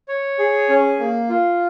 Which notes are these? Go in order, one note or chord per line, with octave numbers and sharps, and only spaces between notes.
C#5
G#4
C#4
A#3
F4